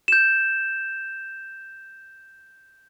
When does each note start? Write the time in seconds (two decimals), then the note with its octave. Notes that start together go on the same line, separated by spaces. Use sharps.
0.08 G6 E7